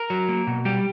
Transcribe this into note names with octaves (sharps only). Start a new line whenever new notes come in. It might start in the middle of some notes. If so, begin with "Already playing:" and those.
Already playing: A#4
F#3
A#3
B2
G3 G4